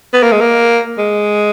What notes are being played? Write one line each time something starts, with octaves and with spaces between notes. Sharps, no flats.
B3
A#3
G#3
A#3
G#3